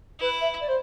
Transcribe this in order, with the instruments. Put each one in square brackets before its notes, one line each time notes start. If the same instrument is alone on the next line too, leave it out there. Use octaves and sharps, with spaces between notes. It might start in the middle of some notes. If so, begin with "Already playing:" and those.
[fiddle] E4 [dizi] B4
[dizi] E5
D5
C5